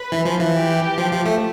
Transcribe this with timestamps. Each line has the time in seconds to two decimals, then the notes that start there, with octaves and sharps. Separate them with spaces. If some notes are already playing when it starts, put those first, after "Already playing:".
Already playing: B4
0.12 E3
0.25 F3
0.40 E3
0.55 G4
0.98 F3
1.12 F3
1.26 A3